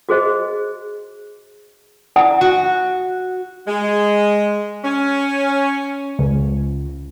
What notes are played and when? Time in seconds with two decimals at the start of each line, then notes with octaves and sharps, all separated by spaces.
0.09 F#4 G#4 C5 D#5
2.16 E4 D5 F#5 G#5 A#5 D#6
2.41 F#4
3.68 G#3
4.84 C#4
6.19 C#2